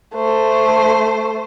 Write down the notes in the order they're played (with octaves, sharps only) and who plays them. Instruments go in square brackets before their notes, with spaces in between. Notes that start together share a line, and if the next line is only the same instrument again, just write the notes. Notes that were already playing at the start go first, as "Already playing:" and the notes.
[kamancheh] A3 C5